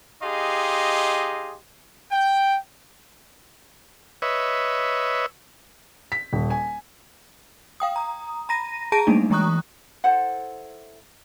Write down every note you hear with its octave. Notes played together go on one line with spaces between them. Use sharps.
D#4 G4 G#4 D#5 F5 C6
G5
B4 C#5 D#5 E5
B6
D#1
G#5
F5 G5 D#6
A#5 D#6
A#5 B5 A#6 D#7
G#4 A5 A#5 A#6 D7 D#7
F#3 G3 A3 A#3 D4 D#4
E3 G#3 A#5 C#6 D#6 F#6
E4 A4 C5 F#5